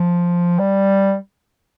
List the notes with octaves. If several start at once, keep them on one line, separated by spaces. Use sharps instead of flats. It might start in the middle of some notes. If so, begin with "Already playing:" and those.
Already playing: F3
G3